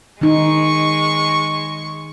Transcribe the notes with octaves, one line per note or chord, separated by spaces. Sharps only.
D#3 G#3 D#4 C#6